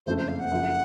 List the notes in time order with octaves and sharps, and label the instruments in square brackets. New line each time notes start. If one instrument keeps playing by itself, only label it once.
[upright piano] F#1 F2 C#3 A3 [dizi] C5
[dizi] C5
F5
F#5
[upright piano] F#1 F#2 F3